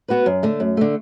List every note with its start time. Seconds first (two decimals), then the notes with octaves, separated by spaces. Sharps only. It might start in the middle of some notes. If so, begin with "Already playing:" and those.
0.08 B3 F#4 B4
0.26 F#2
0.43 D3 A3
0.60 F#2
0.77 D3 A3